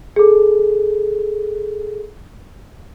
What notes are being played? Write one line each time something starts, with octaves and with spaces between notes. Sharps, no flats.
G#4 A4